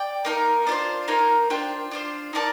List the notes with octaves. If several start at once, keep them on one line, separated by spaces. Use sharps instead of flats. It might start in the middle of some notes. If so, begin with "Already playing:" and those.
Already playing: D5 G5
A#3 D#4 A#4
D4 F4 C5
A#3 D#4 A#4
D4 F4 C5 G5
D4 F4 C5
D#4 A#4 D5 A5